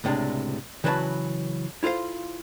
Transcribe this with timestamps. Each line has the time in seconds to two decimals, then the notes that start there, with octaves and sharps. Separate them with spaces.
0.04 C#2 A2 C3 G#3 D4
0.84 C#3 E3 F#3 B4 D#5 A5
1.83 E4 F4 A4 C5 F5